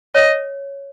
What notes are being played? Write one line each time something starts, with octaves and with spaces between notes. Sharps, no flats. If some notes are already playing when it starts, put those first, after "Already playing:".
C#5 D#5